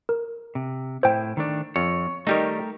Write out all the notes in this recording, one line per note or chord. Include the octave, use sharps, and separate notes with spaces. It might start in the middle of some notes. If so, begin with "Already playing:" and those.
A#4
C3
A2 E4 C5 G5
D#3 A3 D4
F2 C#5
D#3 G3 A3 D#4 G4 A#4